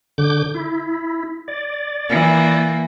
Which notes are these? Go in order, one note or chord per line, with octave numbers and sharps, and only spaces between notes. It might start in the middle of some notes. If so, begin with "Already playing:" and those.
D3 D6 G6
E4
D5
E3 A#3